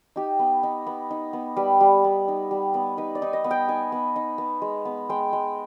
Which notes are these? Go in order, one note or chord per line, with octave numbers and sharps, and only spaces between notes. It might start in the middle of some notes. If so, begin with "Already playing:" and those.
D#4 G4
B3
D#4
B3
D#4
B3
G3 B4
G3
B3
D#4
G3
B3
D#4 B4
D5
D#4
D#5
B3
G5
D#4 G#5
B3
D#4
B3
G#3
B3
G#3 G5
G#3